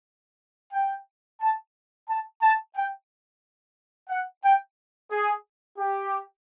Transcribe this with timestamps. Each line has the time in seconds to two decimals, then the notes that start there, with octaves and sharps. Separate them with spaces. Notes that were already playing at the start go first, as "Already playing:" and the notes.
0.73 G5
1.41 A5
2.09 A5
2.42 A5
2.76 G5
4.09 F#5
4.44 G5
5.12 G#4
5.78 G4